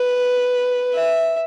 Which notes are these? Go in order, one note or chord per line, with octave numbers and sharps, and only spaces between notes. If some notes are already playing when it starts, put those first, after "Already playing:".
Already playing: B4
E5